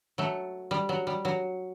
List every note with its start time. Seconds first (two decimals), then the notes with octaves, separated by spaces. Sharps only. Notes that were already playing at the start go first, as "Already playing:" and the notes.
0.18 F#3 A3
0.71 G3
0.89 F#3
1.07 G3
1.25 F#3